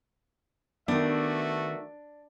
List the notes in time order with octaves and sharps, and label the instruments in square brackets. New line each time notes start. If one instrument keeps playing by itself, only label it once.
[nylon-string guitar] D#3 B3 [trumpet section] A3 F#4 E5 [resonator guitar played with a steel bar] D4